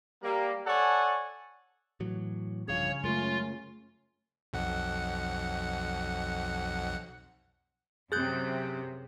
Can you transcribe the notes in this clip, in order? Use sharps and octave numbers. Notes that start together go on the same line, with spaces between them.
G3 A#3
A4 C#5 D5 F#5 G#5 A5
A2 E3 F#3
B1 G2 C#3 F3 C#4 G#4 C#5 F5
F#2 G#3 A3 F4 A#4
B1 F2 F#5
F#2 C3 G#4 F#6 G6